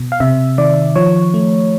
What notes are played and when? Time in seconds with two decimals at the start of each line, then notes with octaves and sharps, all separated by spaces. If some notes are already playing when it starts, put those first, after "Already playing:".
Already playing: B2
0.12 F5
0.20 C3 E5
0.58 D#3 D5
0.96 F3 C#5
1.34 A3